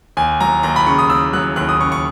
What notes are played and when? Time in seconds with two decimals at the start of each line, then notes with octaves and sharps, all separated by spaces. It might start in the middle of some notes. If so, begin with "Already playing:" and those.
0.17 D#2 G#5
0.40 F#3 A#5
0.63 D#2 A#5
0.76 B5
0.86 C#3 C#6
0.98 D#6
1.10 D#2 E6
1.33 F#3 F#6
1.56 D#2 F#6
1.69 D#6
1.80 C#3 C#6
1.92 C#6